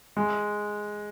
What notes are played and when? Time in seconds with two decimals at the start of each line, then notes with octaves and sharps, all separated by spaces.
0.17 G#3